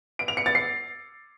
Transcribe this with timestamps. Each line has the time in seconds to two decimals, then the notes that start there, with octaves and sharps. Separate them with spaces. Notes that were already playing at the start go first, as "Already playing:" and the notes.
0.19 D7
0.28 F7
0.37 C#7
0.46 A6
0.55 C7